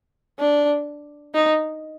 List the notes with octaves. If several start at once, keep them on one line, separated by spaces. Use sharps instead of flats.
D4
D#4